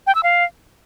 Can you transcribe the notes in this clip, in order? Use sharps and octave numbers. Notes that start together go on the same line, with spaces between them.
G5
E6
F5